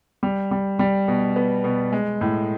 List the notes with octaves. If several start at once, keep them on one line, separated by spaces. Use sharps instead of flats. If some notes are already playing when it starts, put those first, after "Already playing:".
G3
G3
G3
B2
B3
B2
G#3
A2